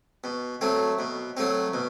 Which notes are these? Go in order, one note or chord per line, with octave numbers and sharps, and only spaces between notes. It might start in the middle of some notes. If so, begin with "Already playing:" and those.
B2
F#3 A3 C4
B2
F#3 A3 C4
B2